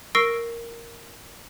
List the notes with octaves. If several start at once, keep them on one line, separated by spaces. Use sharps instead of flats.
A#4 C#6 E6 A#6 C7 D7